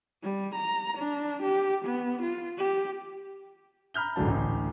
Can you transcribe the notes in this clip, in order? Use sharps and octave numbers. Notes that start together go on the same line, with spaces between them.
G3
A#5
D4
G4
B3
F4
G4
A#5 B5 F6 G6 G7
A1 G#2 D3 F#3 A5
A1 D2